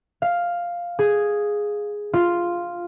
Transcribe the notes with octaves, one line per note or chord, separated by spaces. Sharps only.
F5
G#4
F4